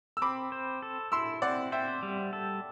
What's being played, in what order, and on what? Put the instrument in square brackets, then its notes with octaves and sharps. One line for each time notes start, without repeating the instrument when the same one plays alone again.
[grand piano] E6
[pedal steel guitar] C4 [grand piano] B5 D6
[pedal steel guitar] C5
A4
[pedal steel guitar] E4 [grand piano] C6 E6
[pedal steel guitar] C4 [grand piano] D5 F#5
[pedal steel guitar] C5 [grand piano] E5 G5
[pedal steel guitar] G3
A4